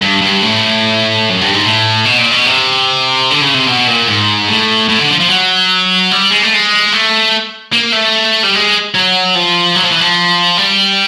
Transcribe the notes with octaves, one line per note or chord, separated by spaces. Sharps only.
G2
G2
A2
F#2
G2
G#2
A2
B2
A#2
B2
C3
D3
C#3
C3
B2
A#2
G#2
A2
A2
D3
F3
F3
F#3
G3
G#3
A3
G#3
A3
A#3
A3
G3
G#3
F#3
F3
F#3
F3
E3
F3
G3